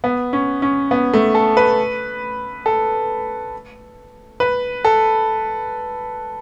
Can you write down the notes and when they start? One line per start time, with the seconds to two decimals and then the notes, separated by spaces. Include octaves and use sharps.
0.04 B3
0.33 C#4
0.62 C#4
0.91 B3
1.14 A3
1.35 A4
1.57 B4
2.66 A4
4.40 B4
4.85 A4